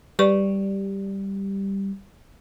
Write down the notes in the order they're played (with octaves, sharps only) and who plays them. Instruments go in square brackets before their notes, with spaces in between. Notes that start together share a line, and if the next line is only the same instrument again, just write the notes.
[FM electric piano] G3 [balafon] B4 D5 C#6